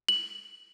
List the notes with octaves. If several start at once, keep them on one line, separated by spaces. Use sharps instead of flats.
F#7